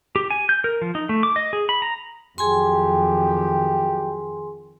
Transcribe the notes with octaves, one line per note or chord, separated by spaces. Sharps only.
G4
G#5
G6
A#4
F3
D#4
A3
D6
D#5
G#4
B5
A#5
F2 D#3 F#3 G4 G#4 G#5 C6